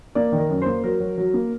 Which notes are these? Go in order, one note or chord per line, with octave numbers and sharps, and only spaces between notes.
A#3 D5
D#3
A#4
F#2
A#3 C5
F#3 A#4
F#3
F#3
A#3